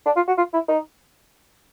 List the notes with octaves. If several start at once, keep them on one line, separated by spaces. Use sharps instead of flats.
D4
F4
F#4
F4
E4
D#4